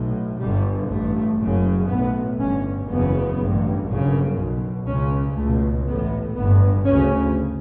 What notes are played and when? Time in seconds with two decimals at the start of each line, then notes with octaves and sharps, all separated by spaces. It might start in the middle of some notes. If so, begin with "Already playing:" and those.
Already playing: B1 A2
0.39 G1 G2 G3
0.89 A1 G2 A3
1.39 F#1 F#2 C#3
1.88 B1 A2 B3
2.38 G1 G2 C#4
2.88 F#1 E2 C#3 B3
3.37 A1 G2
3.87 G1 F#2 C#3
4.37 B1 B2
4.86 C#2 C#3 C#4
5.36 C#2 B2 A3
5.86 A1 A2 B3
6.36 G1 G2 B3
6.85 D2 C#3 C#4